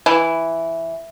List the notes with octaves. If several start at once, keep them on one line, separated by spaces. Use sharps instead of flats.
E3